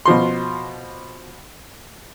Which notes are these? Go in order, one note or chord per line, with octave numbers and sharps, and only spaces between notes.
B2 F3 C6